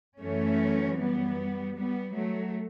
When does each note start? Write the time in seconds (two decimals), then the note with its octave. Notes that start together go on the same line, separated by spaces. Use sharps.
0.18 F#2 E3 A3 C#4
0.97 G3 B3
1.76 G3 B3
2.15 F#3 A3